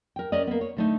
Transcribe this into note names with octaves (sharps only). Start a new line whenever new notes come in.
A#4 G5
C#4 A#4 D5 D#5
A#3 B3
C#5
D3 A3 D#4